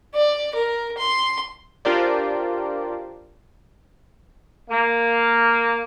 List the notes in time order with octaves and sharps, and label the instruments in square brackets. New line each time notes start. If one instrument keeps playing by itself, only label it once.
[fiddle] D5
A#4
C6
[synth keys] D4 F4 G4 A#4 C5 D5
[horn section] A#3